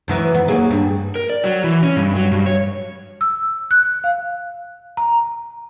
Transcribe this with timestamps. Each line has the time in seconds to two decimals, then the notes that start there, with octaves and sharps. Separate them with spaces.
0.08 F#2 D#3 E3
0.35 B3
0.48 F#3 A#3 G#4
0.71 G2 G3
1.16 A#4
1.30 D5
1.44 F#3
1.64 E3
1.83 C#4
1.96 G2
2.15 F#3
2.31 G2
2.46 C#5
3.21 E6
3.71 F#6
4.04 F5
4.97 A#5